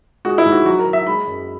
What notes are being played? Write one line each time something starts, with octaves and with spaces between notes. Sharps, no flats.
G#3 F#4
E4
G#2
F#4
F#3 F#4
A#4
F#3
E5
G#3 B5
F#2